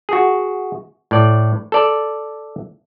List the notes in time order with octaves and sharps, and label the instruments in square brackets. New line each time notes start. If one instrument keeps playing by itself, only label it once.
[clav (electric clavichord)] F#4 G#4
A2 D5
A4 D5